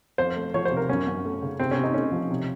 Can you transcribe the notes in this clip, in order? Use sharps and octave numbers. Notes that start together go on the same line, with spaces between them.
F2 C5
A3
F3 C#5
C5
C3
A#4
F#2 C#4
F#2
A3
C#3
C3 C4
C#4
C3
D#4
A3 C#4
F3
C3